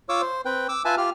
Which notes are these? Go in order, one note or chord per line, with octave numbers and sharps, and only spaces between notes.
F4 C#5 D6 E6
C5
C4 B4 G5
D6 E6
F4 B4 E5 G#5 A5
F4 G4 F6